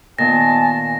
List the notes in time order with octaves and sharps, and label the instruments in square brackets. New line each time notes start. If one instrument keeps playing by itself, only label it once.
[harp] A#2 D#3 B3 [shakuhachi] G#5 [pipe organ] A5 [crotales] A#6